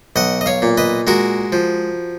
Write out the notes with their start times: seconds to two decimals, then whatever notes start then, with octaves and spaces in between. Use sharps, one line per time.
0.16 B1 D#5 F#5
0.41 D#5
0.46 C#5 F5
0.62 A#2
0.77 B4 D#5
1.07 G#3 F#4 A#4
1.52 F3